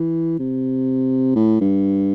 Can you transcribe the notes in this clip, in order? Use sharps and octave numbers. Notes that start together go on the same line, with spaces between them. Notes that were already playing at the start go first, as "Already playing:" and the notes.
Already playing: E3
C3
A2
G2